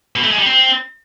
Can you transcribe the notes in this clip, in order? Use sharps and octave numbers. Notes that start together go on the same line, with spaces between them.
B2
A3
G#3
G3
C4